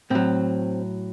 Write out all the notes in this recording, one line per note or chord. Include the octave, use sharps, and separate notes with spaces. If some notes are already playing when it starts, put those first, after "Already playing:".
A2 F#3 C4